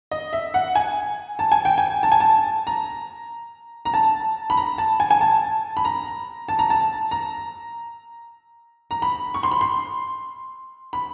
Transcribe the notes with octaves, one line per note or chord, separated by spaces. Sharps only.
D#5
E5
F#5
G#5
A5
G#5
G5
G#5
A5
G#5
A5
A#5
A#5
A5
B5
A#5
A5
G#5
G#5
A5
B5
A#5
A5
A#5
A5
A#5
A#5
B5
C#6
C6
B5
C6
B5